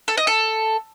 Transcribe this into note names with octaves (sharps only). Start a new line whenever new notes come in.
A4
D#5
A4